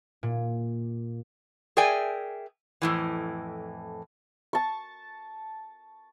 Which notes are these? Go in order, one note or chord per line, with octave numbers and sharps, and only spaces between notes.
A#2
G#4 A#4 D5 E5 G5 G#5
F2 A2 E3
A5 C#6